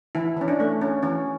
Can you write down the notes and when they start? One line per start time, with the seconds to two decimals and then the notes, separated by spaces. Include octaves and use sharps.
0.15 E3 E4
0.37 E3 C#4
0.48 D4
0.60 A3
0.81 C#4
1.03 E3 C#4